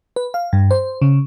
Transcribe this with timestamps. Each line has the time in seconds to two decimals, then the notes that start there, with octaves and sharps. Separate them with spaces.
0.16 B4
0.34 F5
0.53 G2
0.71 C5
1.02 C#3